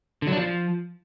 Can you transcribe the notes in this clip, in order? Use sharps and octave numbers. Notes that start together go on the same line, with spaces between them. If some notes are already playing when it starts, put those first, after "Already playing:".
D3
F#3
D4
F3